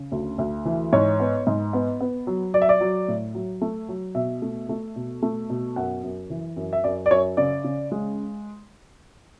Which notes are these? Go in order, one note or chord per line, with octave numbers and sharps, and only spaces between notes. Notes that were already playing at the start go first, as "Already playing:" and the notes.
Already playing: C#3
D2
D2
E3
G#2 C#5
B3
G#2
B3
B3
F#3
F#3 D5
E5
D5
F#3
A2
F#3
A3
F#3
B2 E5
A3
A3
B2
A3
B2
F#2 F#5
F#2
E3
F#2
E5
F#2 D5
D5
F#2 C#5
C#3 D5
C#3
G#3